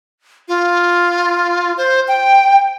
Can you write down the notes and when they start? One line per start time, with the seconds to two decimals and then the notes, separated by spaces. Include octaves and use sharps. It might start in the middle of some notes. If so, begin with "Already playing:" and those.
0.48 F4
1.78 C5
2.08 G5